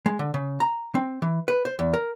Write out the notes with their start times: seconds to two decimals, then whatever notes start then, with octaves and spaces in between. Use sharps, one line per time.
0.06 G#3
0.19 D3
0.34 C#3
0.60 A#5
0.95 C4
1.22 E3
1.48 B4
1.65 C5
1.79 E2
1.94 A#4